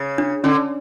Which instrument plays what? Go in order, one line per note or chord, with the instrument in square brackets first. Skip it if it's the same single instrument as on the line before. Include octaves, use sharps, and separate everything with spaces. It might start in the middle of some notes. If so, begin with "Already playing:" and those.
Already playing: [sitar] C#3
[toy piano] D4
[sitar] D3 [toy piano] C#4